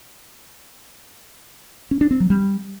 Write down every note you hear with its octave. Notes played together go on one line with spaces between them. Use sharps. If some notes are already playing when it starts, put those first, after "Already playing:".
C#4
D4
C4
F#3
G3